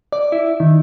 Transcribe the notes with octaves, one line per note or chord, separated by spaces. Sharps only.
D5
E4
D#3